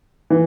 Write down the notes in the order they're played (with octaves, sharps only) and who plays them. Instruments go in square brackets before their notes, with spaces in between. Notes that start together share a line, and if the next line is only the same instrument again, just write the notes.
[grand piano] E3